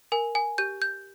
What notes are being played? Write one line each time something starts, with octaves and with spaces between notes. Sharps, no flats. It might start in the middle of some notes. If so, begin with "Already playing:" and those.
A#4 G#5
G#5
G4 G6
G6